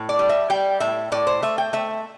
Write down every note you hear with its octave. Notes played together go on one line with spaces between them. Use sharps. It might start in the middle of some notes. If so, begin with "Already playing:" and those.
Already playing: A2
D5
G3
E5
G3 G5
A2 E5
A2 D5
C5
A3 E5
G5
A3 E5